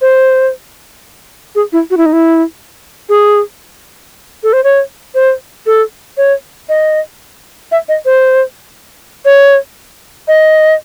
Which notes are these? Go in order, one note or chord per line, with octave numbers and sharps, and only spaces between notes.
C5
G#4
E4
F#4
E4
D#4
E4
G#4
A4
C5
C#5
C5
A4
C#5
D#5
E5
D#5
C5
C#5
D#5